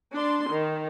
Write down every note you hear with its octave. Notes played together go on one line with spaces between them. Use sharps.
D4 C6
D#3